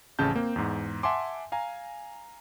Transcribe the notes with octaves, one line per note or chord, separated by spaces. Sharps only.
A1 F2 C#3 C#4 A5 G6
A#3 C4
E2 G#2
E5 F#5 G#5 A5 C6 D6
F5 G#5 A#5